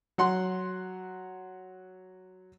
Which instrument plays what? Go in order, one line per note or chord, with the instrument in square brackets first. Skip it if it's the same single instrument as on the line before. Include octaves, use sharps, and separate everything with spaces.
[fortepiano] F#3 F#5 C6